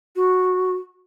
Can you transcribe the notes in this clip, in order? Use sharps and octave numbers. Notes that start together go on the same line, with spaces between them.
F#4